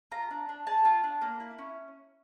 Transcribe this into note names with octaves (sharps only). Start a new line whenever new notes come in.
F4 A#5
D4
D4
G#4 A5
F4
D4
A#3
E4
C#4